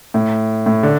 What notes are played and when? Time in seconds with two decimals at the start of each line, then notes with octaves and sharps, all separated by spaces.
0.14 A2
0.66 A2
0.83 D3